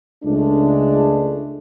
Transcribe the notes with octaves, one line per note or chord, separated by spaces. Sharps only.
C#2 G#3 A3 D4